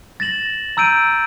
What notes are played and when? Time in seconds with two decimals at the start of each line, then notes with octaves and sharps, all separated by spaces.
0.20 A6 A#6 E7 F#7
0.77 A#5 E6 G6 D7 D#7